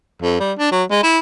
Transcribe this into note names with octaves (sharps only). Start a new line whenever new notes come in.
F2
G3
D4
F#3
G#3
E4